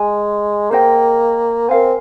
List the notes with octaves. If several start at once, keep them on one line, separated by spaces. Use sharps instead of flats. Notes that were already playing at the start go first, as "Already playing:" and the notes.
Already playing: G#3 G#5
A#3 G#4 C5 D#5 G5
C4 A#4 F5 G#5